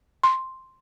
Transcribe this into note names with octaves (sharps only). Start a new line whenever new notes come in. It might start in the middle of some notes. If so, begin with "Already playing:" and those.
C6